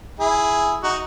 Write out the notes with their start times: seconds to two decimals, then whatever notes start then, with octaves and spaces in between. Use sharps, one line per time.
0.19 E4 G#4
0.83 D#4 F#4